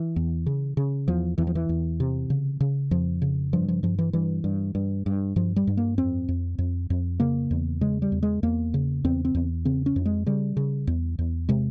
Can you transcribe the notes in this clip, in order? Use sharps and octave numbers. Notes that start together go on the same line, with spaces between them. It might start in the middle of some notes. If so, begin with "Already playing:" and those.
Already playing: E3
E2
C#3
C#3
E2 F3
E2 E3
F3
E3
E2
C3
C#3
C#3
F2 F3
C#3
G2 F3
F3
G2 F3
E3
G2 E3
G2
G2
G2
G2 F3
G3
G2
A#3
F2 C4
F2
F2
F2
C#3 A#3
E2
C#3 G#3
G3
E2
G#3
E2 A#3
C#3
E2 C4
C4
E2
C#3 C4
C#4
F2
G#3
C#3 G3
C#3
E2
E2
C3 G#3